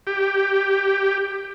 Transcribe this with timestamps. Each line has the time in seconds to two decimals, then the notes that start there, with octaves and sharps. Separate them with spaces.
0.07 G4